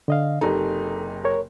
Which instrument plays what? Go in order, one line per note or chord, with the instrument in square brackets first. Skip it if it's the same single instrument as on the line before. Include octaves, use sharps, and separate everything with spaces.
[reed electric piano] D3 D#5 F5
[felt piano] F#1 C3 D#4 [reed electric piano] A4
[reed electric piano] A#4 C#5